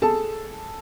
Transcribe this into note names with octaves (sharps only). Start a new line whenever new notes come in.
G#4 A4 A5